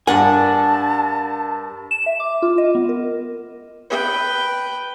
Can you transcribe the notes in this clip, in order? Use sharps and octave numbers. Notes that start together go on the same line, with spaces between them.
G2 D4 A#4 F#5 G#5 A5
E7
E5
D6
F4
D#5
B3
A#4
B4 G5